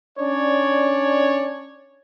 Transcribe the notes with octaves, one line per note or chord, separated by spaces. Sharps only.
C#4 D4 C#5 D5